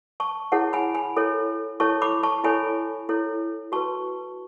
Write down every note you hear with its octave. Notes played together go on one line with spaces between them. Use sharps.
A5 C#6
E4 G#4 C#5 F#5 A5
G#5 B5
G#5 B5
E4 A4 C#5
E4 A4 C#5 A5 C#6
B5 D6
A5 C#6
E4 A4 C#5 G#5 B5
E4 A4 C#5
F#4 B4 A5 C#6